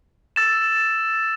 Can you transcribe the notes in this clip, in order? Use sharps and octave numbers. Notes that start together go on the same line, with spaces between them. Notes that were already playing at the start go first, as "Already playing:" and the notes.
E6 A6 E7